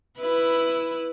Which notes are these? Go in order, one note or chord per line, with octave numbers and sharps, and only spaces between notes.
E4 B4